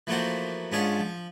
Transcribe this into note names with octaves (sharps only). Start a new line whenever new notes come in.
E3 F3 A3 A#3 F#4 C5
G#2 C#4 D4 F4 G#4 C#6
F3